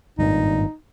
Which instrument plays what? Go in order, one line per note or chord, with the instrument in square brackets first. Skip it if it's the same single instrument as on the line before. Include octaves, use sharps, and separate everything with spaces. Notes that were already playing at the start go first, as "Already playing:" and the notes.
[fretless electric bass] G#1 G2 A#2 [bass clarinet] D#4